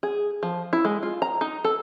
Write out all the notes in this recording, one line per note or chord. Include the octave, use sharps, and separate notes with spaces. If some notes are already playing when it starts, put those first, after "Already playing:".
G#4
F3
E4
G#3
F4
A#5
D#4
A4